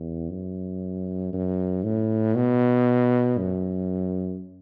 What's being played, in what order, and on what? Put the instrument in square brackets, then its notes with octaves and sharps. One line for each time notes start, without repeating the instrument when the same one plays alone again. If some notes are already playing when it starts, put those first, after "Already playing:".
Already playing: [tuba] E2
F#2
F#2
A2
B2
F#2